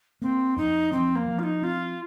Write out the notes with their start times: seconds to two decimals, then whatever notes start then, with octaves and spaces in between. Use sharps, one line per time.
0.22 A#3 C4
0.57 F2 D#4
0.92 F3 C4
1.16 A#3
1.28 F3
1.39 F4
1.43 D#4
1.62 C4 F4